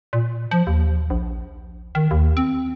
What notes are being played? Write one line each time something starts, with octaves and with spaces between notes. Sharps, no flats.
A#2
F3
D#2
A#1
D#3
D#2
C4